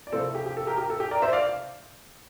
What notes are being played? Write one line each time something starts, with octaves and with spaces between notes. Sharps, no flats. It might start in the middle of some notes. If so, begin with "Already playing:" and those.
D5
C3 F3 A3 E4 A4 C5
A4
G4
G4
A4
G4 A#4
G4 A#4
A4
G4
A#4 D5
C5 E5
D5 F5